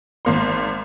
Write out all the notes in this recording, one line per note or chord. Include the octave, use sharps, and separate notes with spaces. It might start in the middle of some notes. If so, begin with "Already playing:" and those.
G#1 A#3 C6